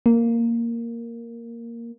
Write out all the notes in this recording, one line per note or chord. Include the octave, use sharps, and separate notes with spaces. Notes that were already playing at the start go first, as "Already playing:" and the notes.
A#3